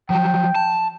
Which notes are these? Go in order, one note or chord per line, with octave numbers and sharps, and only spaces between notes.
F3 F#3 G5
A5